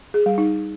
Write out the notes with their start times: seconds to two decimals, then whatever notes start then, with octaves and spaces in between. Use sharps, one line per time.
0.14 G#4
0.26 G3
0.38 D#4